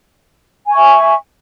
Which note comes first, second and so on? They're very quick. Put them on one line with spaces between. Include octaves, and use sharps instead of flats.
G#5 C#6 E5